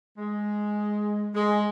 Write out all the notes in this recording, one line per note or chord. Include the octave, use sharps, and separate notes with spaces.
G#3
G#3